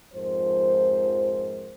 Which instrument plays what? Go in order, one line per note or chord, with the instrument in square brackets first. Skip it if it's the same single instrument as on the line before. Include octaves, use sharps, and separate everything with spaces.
[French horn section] F2 G#2 F3 A#4 C5